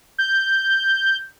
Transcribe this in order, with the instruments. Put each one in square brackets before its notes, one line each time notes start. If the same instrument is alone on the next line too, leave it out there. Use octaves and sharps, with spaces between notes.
[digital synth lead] G6